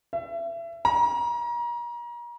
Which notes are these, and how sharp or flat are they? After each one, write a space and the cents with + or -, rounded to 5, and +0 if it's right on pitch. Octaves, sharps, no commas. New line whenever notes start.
E5 +30
A#5 +35